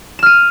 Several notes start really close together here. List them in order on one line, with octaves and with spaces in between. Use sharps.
E7 F6 D#7